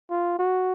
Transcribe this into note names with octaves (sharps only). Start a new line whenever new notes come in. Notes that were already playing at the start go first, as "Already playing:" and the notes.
F4
F#4